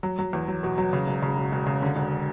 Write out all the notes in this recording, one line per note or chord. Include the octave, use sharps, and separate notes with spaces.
F#3
F#3
E2
F#3
B2
F#3
C#3
E1
C#3
E1
E1
C#3
D3
E1